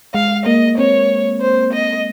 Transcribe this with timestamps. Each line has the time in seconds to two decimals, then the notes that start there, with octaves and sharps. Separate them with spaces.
0.14 G#3 F5
0.46 A#3 D#5
0.78 C4 C#5
1.41 C5
1.73 D#5